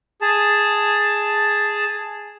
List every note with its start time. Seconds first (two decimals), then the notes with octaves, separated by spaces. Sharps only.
0.21 G#4 A5